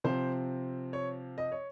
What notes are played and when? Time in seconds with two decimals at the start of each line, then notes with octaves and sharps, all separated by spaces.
0.04 C3 F3 C4 C5
0.93 C#5
1.38 D#5
1.52 C#5